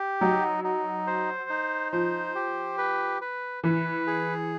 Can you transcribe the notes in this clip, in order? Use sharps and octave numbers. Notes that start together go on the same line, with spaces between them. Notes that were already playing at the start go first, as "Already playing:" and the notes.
Already playing: G4
F#3 D#4
D#4
C5
D#4
F3 C5
G4
B4
B4
E3 B4
G#4